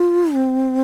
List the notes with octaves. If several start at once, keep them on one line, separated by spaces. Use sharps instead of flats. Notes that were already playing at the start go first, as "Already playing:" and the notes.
Already playing: F4
C4